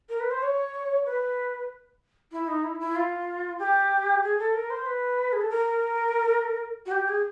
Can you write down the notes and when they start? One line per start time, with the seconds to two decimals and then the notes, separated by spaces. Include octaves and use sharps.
0.09 A#4
0.20 B4
0.30 C5
0.42 C#5
1.05 B4
2.31 E4
2.47 D#4
2.63 E4
2.79 E4
2.95 F4
3.58 G4
4.22 G#4
4.38 A4
4.53 A#4
4.69 C5
4.85 B4
5.32 G#4
5.40 A4
5.49 A#4
6.85 F#4
6.91 G4
7.08 G#4